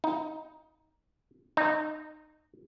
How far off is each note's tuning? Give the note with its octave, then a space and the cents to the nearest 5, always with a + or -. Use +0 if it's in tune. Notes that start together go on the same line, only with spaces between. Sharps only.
D#4 +10
D#4 -20